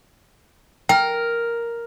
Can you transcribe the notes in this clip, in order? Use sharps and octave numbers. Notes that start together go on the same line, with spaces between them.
A#4 G5